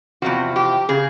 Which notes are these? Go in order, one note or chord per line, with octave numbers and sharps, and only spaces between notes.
E2 C3 F3 F#4
G4
C#3 G#4